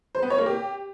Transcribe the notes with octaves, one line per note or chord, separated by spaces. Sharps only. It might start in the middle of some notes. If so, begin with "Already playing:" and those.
C5
B3
C#5
A#3
G4